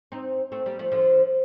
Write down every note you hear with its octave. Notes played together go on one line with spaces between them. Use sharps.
C4 D#4
A3 C4
G3 A#3
F3 A3
D3 F3